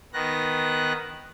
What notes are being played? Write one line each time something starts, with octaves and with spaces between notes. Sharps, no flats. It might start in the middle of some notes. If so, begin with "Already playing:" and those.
D#3 B3 F#6 A#6